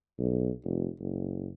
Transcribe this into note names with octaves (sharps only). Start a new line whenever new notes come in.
B1
F1
F#1